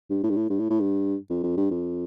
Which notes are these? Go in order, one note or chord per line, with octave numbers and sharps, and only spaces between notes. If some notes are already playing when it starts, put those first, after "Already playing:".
G2
A2
G2
A2
G2
A2
A2
G2
F2
F2
G2
F2